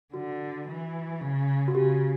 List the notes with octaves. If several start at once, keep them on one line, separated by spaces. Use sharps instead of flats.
D3 F#4
E3
C#3
F#4
C#3 G4